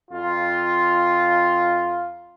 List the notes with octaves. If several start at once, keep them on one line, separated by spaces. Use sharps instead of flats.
F2 F4